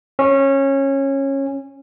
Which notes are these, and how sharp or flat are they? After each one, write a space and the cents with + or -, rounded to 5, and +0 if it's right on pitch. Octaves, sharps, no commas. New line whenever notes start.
C#4 -20